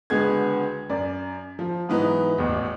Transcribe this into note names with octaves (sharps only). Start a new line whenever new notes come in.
C#2 D3 B3 F#4 G#4 G#6
F#2 D5
F3
G#2 E3 F#3 B3 D#4
D#1 A1 E2